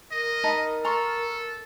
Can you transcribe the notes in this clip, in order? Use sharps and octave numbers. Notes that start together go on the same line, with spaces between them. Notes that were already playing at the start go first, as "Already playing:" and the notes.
A#4 D#5
D#4 A5 B5
A4 A#5 C6 C#6